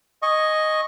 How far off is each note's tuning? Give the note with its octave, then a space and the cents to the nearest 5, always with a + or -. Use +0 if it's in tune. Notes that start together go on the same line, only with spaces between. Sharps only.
D#5 +0 G#5 +0 C#6 -5